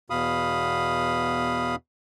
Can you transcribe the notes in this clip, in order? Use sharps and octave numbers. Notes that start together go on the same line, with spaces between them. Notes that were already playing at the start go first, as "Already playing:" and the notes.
E2 B2 F5 B5 D#6